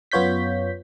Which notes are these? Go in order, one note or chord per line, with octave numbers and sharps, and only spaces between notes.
F#2 B3 F4 C#5 G6 B6